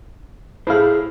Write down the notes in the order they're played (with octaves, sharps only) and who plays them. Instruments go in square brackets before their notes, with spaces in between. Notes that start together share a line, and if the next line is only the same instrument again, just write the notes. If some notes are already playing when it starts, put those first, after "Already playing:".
[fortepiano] A2 E4 F5 [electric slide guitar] G#4 C5